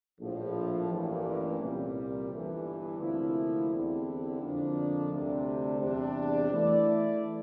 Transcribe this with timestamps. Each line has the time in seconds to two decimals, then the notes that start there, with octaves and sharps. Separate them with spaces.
0.20 A#1 A2 F3
0.90 A1 G2 E3 A#3
1.60 C2 A#2 G3 A#3
2.30 G1 G2 E3
3.00 D2 C3 F3 A#3 E4
3.70 E2 D3 G3 C4 E4
4.41 F2 D3 F3 A#3 D4
5.11 D2 C3 G3 D4
5.80 E2 C3 G3 D4
6.51 E3 A3 E4 A4 D5